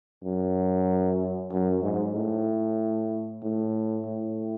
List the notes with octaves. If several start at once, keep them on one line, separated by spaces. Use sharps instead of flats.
F#2
F#2
G#2
A2
A2
A2